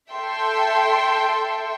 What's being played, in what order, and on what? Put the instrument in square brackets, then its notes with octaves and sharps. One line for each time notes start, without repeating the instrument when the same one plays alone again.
[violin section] A4 E5 G5 C6